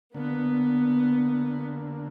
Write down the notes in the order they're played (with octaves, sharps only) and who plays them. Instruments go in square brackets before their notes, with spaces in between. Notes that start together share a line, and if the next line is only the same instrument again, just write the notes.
[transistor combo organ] D3 A#3 [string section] B3